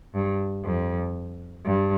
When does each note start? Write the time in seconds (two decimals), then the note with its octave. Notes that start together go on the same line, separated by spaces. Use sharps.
0.14 G2
0.64 F2
1.65 G2